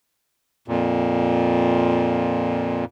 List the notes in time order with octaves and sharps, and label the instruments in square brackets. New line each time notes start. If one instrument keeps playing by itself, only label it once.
[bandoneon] F2 A#2